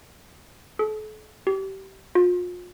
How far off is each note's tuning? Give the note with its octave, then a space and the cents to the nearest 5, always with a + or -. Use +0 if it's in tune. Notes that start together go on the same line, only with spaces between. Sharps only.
A4 -40
G4 -25
F4 +40